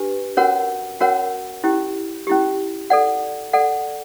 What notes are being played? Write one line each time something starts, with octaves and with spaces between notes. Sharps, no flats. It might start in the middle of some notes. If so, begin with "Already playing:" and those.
Already playing: D4 G4 B4
C#4 F#4 A#4 C#5 F#5
C#4 F#4 A#4 C#5 F#5
C#4 E4 G4
C#4 E4 G4
A4 D5 F#5
A4 D5 F#5